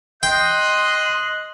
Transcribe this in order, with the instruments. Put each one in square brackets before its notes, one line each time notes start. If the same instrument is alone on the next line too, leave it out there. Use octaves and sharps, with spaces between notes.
[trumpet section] D#5 [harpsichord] G5 [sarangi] C6 [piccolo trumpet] F#6